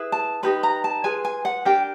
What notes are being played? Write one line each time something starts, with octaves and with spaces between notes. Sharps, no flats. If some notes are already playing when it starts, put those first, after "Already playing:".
Already playing: E4 G#4 B4
A5
D#4 G4 B4 B5
A#5
A5
F4 G#4 B4 G#5
G#5
F#5
D4 G4 A#4 G5